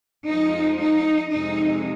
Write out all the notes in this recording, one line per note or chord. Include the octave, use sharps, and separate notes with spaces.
F2 F3 G#3 D#4
D#4
F2 C3 G#3 D#4